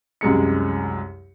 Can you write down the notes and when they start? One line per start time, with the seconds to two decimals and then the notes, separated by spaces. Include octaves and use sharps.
0.21 C2 F#2 G#3 C#7